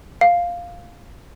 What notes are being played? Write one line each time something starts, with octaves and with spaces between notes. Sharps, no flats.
F5